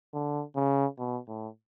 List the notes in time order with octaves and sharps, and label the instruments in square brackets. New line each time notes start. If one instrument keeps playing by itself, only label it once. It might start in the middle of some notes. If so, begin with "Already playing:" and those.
[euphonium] D3
C#3
B2
A2